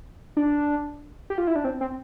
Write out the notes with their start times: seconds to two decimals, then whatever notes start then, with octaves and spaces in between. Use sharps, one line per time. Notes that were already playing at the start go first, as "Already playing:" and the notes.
0.37 D4
1.30 G4
1.38 F4
1.47 E4
1.56 D4
1.64 C4
1.81 C4